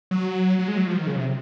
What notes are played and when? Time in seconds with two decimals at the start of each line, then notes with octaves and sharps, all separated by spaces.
0.11 F#3
0.59 F#3
0.68 G#3
0.77 F#3
0.87 F3
0.97 D#3
1.07 C#3
1.16 C3